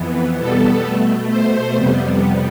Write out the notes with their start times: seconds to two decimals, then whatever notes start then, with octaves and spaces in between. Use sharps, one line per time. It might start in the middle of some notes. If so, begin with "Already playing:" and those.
Already playing: F2 E3 B3
0.38 B2 G3 B3 A4
0.84 B2 A3
1.30 B2 A3 C5
1.76 F2 C3 G3 B3